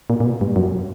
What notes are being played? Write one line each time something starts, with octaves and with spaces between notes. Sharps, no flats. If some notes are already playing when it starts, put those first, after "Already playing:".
A#2
A#2
B2
G2
F#2